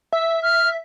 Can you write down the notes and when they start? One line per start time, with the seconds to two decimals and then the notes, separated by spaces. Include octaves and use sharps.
0.13 E5 E6
0.42 F6